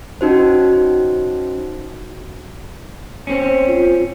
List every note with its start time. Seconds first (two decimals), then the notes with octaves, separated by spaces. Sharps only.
0.21 C#4 D#4 F#4 C5
3.27 C4 C#4
3.68 F4